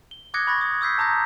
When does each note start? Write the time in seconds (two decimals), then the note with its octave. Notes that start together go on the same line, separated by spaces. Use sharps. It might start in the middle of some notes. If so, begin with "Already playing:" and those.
0.11 G7
0.34 D6 D#6 F#6 G#6 A#6 C#7
0.47 B5 C#6 F#6 A6 A#6
0.61 D#6
0.81 D#6 E6 G6 B6 C7
0.98 A5 A#5 D#6 G6 A#6